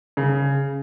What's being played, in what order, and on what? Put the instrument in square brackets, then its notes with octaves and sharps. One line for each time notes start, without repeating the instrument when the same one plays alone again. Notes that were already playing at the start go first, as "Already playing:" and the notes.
[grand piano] C#3